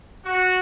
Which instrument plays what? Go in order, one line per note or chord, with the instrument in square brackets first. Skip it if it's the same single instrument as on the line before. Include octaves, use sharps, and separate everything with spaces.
[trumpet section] F#4